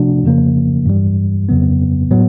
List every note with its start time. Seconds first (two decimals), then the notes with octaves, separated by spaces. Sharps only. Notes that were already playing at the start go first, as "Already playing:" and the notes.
Already playing: C3 F3 A3 D4 F#4
0.24 F2 C#3 F3 A#3
0.86 G2 E3 G3
1.49 F2 C#3 F#3 B3
2.11 A2 F#3 B3